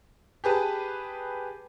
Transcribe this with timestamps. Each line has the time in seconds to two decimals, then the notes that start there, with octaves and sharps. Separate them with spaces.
0.44 G4 G#4 B4 A5